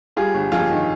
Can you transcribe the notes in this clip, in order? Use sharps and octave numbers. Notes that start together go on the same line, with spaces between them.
G3 F4 G#4
G1
F2 F4 G#4
D#3